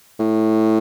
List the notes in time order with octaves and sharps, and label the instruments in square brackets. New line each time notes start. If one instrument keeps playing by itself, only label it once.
[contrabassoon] A2